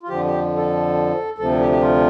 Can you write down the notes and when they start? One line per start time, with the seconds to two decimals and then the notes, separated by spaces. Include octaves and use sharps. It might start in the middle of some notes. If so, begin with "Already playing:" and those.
0.03 F4
0.09 F2 D3 F3 G4
0.25 G4
0.57 A4
1.38 D2 C3 F3 A4
1.60 G4
1.71 G4
1.81 F4